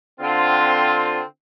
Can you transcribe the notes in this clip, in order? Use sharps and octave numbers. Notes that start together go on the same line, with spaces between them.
D3 C4 F4